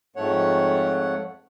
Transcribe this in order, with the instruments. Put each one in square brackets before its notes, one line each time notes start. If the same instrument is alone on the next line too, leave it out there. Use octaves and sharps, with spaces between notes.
[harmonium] F2 G#2 A3 C#5 F#5